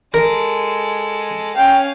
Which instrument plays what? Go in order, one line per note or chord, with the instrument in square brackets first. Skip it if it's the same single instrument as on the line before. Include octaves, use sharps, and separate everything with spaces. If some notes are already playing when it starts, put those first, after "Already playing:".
[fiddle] G#3 A4 [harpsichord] A#4
[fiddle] C#4 F5 [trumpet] G5